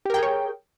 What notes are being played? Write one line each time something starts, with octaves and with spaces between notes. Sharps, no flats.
G4 G#4 A#4 C#5 G5